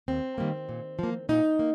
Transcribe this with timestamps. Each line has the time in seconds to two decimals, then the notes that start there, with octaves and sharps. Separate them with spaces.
0.08 D#2 C4
0.38 D#3 G3 A#3
0.69 A#2
0.99 F3 A#3
1.29 A#2 D#4
1.59 A#3